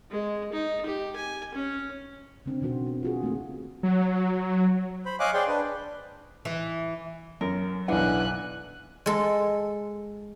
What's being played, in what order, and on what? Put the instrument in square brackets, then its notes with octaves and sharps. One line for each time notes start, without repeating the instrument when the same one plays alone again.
[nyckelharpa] G#3
D#4
G4
G#5
C#4
[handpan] C#3 C4 D4
B2 D#3 C4 F#4 C5
B3
F4 F#4 G#4
A3 A#3 C4
[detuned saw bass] F#3
[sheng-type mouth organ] C5 B5
C#5 D#5 F5 G#5 D6 F#6
G#4 C5 D5 G5 C6
D4 B4
[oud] E3
[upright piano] F#2 [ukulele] A#4
[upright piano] B1 F5 [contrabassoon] E3 [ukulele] D4 F#5 [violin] G#5 F#6
[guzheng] G#3 A4